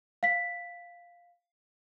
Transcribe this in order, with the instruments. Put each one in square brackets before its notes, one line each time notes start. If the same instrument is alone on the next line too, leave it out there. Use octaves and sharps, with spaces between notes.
[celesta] F5 B6